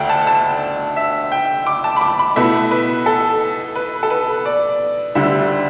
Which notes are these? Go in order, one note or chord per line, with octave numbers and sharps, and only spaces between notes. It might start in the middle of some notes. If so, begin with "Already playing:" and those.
Already playing: D2 D3 A3 D4 G5
A5
A5
E5
G5
D6
A5
B5
D6
B5
B2 A3 E4 E5
B4
A4
B4
A4
B4
D5
D2 D3 G3 E5